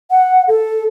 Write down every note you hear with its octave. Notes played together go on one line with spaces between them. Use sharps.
F#5
A4